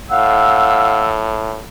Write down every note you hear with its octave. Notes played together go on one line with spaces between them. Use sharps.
A2 F5 F#5 E6